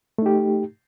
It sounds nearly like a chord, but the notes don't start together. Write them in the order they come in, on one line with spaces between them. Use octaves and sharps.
A3 D#4 G4